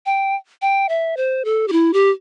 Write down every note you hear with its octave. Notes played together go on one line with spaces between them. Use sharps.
G5
G5
E5
C5
A4
G4
E4
G4